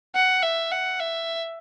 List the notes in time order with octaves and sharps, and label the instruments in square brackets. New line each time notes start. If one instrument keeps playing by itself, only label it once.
[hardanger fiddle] F#5
E5
F#5
E5